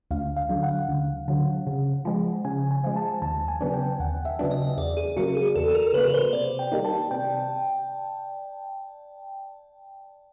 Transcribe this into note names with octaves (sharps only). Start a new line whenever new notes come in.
D2 F5
F5
D3 F#3
F#5
D2
D3 F#3
C#3
F3 G#3
C#3 G#5
G#5
F3 G#3
A5
D#2 A5
G#5
C#3 F#3 B3 D4
G5
D#2 F#5
E5
C#3 F#3 B3 D4
D#5
E2 D5
G#4
C#3 F#3 A#3 F#4
G#4
E2 A4
A#4
C#3 F#3 A#3 B4
C5
C3 D5
G5
D#3 G3 A#3 D#4
A5
C3 G5